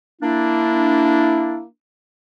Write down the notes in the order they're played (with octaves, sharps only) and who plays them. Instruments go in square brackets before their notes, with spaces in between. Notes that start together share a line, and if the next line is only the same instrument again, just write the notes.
[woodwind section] A#3 D4 [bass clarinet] E4